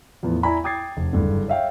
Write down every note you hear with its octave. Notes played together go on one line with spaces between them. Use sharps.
E2 A2 F3 B3
E4 D5 G#5 A#5 B5
G5 D6 D#6 G#6 A6 C7
F1
F#1 G2 D3
C#5 E5 F5 G5